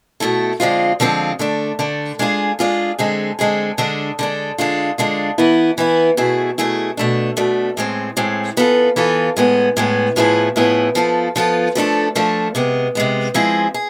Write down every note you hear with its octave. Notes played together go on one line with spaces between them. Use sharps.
B2 A3 E4 A4
D3 F3 G#3 C4 F4
D3 F3 G#3 C4 F4
D3 A3 D4
D3 A3 D4
G#3 D4 F4 G#4
G#3 D4 F4 G#4
D3 G#3 C4 G#4
D3 G#3 C4 G#4
D3 G#3 D4
D3 G#3 D4
D3 G#3 D4 F4
D3 G#3 D4 F4
E3 B3 E4
E3 B3 E4
B2 A3 E4 G#4
B2 A3 E4 G#4
B2 A3 D4
B2 A3 D4
A2 G#3 C4
A2 G#3 C4
E3 B3 F4 A4
E3 B3 F4 A4
A2 G#3 B3
A2 G#3 B3
A2 F3 B3 E4 G#4
A2 F3 B3 E4 G#4
F3 B3 F4 A4
F3 B3 F4 A4
F3 A3 D4 A4
F3 A3 D4 A4
C3 G#3 B3
C3 G#3 B3
F3 G#3 C4 E4 G#4
G#4